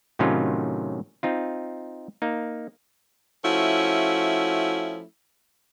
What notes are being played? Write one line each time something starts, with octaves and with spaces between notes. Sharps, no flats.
A2 C3 D#3 F#3 C#4 F4
C4 D#4 F4
A#3 D#4
F3 A3 C#4 E4 F#4